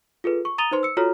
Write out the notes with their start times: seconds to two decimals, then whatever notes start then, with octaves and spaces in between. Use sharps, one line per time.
0.24 F4 G#4 A4 B4
0.45 C#6
0.58 A#5 D#6 A6 D#7 F7 G7
0.71 D#4 B4 C5 C6
0.83 E6 C#7
0.97 F4 F#4 A4 C#5 A#5 F6